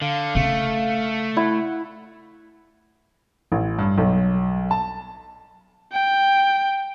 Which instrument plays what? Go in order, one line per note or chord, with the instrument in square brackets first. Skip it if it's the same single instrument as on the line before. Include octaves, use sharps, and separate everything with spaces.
[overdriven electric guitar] D3 [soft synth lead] F5
[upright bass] C#3 C#4 [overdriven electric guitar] A3
[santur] E4 [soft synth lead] F#5
[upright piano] A1
G2
B1
A5
[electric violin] G5